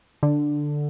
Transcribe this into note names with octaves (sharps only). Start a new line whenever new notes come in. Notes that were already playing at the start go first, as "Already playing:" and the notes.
D3